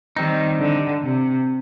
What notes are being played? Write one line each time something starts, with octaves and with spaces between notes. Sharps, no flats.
D#3 G3 C4 D#4
D3
C3